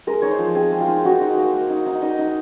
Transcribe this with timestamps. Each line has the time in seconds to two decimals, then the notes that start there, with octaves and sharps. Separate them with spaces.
0.07 G#3 A#4
0.22 D#4 C#5
0.31 C5
0.39 F3
0.55 C4 G#4
0.72 G#3
0.81 F4
0.88 D#4
1.05 D#4 F#4
1.21 D#4
1.37 A#3
1.53 A#3
1.70 D#4
1.86 D#4
2.02 D#4 D#5
2.19 D#4